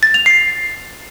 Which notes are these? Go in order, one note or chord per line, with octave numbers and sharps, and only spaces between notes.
A6
F7
C7